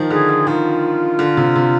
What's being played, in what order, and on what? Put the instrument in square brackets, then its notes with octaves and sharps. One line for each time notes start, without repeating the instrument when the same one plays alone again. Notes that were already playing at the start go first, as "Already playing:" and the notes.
Already playing: [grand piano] D#3 F3
[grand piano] D3 [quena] G#4
[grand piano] D3
[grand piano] D#3 [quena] F4
[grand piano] D3
C3
C3